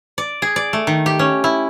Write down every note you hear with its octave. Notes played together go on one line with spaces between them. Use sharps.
D5
G#4
D5
A3
D#3
G4
C#4
E4